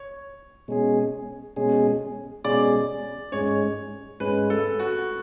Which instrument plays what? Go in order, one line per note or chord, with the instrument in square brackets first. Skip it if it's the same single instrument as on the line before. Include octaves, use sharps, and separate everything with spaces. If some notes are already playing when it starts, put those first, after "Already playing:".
Already playing: [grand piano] C#5
[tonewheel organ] B2 G#3 C#4 G#4
B2 G#3 C#4 G#4
[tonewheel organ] B2 G#3 C#4 G#4 [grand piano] D5
[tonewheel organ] G#2 G#3 C#4 [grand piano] C#5
[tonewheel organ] G#2 G#3 C#4 [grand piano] B4
[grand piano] A4
F#4